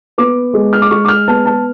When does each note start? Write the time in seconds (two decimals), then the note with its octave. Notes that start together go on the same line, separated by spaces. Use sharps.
0.18 B3 D6
0.54 G#3
0.73 F6
0.82 D6
0.91 G#3 C#6
1.05 D6
1.08 F6
1.28 B3 A5
1.46 A5